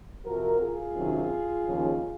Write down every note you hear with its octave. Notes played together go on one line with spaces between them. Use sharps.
F2 C3 F3 F#4 A#4
F4 G#4
C3 D#3 F#3 C#4
D#2 C#3 F3